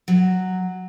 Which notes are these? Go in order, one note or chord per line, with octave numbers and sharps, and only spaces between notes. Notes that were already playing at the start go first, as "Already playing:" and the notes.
F#3